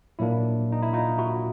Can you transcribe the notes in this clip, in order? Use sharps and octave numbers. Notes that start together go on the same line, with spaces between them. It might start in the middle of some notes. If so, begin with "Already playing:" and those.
A#2 F#3 A#3 D4 E4
D#4
E4
D#4 F4
E4 F#4